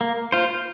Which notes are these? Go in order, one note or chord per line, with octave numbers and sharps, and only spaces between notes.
A#3
F4 C5